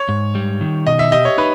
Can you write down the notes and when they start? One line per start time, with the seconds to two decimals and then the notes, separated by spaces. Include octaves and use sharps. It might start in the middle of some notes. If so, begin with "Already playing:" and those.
Already playing: C#5
0.09 G#2
0.35 G3
0.61 D#3
0.86 B2 D#5
0.99 E5
1.12 G4 D#5
1.25 C#5
1.38 D#4 B4